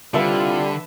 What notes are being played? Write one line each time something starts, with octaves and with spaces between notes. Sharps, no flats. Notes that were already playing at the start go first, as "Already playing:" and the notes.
C2 D3 G3 F4 B4 E5 A5